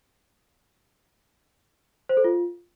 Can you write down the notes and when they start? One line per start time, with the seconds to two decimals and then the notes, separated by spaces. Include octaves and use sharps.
2.09 C5
2.17 A4
2.24 F4